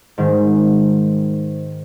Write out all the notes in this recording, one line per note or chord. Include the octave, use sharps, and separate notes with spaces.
G#2 D#3